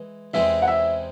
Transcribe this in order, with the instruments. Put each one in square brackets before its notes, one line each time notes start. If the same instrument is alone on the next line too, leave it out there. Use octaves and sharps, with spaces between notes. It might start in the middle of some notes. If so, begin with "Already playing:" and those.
Already playing: [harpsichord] E3 G#3
[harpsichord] E2 C3 E3 G#3 C4 [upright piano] E5
[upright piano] F#5
E5